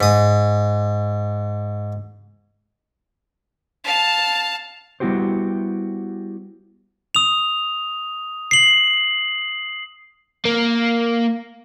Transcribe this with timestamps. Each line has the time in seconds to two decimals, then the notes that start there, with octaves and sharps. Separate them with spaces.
0.01 G#2 D#6
3.84 F5 A5
5.00 G3 B3 E4 F#4 G4 C5
7.15 D#6 F7
8.51 C7 F#7
10.45 A#3